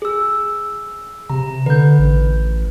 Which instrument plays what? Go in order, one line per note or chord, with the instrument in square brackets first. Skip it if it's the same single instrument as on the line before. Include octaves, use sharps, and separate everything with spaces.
[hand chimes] G#4 E6
[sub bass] C3 [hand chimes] A#5
[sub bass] D3 [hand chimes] B4 G6
[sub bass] A1